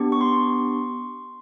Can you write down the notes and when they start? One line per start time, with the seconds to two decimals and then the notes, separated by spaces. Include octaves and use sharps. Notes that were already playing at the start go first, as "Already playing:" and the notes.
Already playing: B3 D4 G4
0.12 C#6
0.21 C6